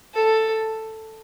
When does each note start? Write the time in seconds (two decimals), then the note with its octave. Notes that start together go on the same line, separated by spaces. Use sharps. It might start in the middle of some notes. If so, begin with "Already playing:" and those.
0.14 A4